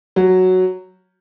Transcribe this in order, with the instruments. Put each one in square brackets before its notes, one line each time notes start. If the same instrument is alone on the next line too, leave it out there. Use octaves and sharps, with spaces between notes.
[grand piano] F#3